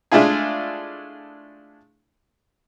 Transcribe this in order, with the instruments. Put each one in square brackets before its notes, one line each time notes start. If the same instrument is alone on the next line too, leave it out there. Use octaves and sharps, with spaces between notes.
[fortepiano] G#3 A3 D4 E4 F4 G#4